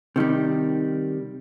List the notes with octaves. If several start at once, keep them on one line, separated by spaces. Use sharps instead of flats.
C3 D#3 G3